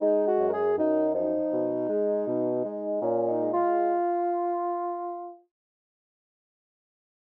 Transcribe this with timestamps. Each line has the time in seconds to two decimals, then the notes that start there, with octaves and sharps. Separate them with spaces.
0.01 G#3 D#4
0.26 F#4
0.40 F#2
0.47 A#4
0.52 G#4
0.77 F#2 D#4
1.14 F3 D#4
1.52 B2
1.89 G#3
2.27 B2
2.64 G#3
3.02 A#2 C#4
3.27 D#4
3.40 G#3
3.53 F4